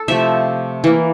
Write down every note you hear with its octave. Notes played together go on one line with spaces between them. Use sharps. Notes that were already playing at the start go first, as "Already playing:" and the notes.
Already playing: A4
C3 F3 A3 E5
E3 A#3